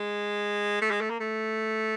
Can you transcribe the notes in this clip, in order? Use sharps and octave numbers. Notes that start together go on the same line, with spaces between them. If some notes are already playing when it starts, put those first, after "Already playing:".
Already playing: G#3
A3
G#3
A3
A#3
A3